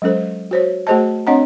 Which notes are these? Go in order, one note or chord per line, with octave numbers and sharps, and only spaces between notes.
F#3 G#3 C#4 A4 C5
F#4 C5 C#5
A3 F#4 G#4 C5 D#5 A5
C4 D4 C#5 D#5 F#5 A#5